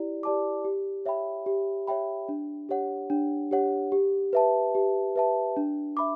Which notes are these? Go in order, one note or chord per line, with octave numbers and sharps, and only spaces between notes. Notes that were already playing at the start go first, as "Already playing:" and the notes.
Already playing: E4 G4 D5
G4 D5 A5 D6
G4
C#5 E5 G5 B5
G4
C#5 E5 G5 B5
D4
G4 C#5 F#5
D4
G4 C#5 F#5
G4
B4 E5 A5
G4
B4 E5 A5
D4
E5 B5 D6